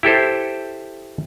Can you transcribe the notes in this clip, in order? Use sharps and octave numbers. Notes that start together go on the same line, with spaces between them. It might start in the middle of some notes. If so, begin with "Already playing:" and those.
E4 G4 A4 C5